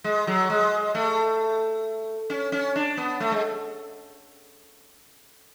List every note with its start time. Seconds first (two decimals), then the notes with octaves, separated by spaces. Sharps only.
0.04 G#3
0.27 F#3
0.50 G#3
0.95 A3
2.30 C#4
2.52 C#4
2.76 D4
2.97 B3
3.20 A3
3.32 G#3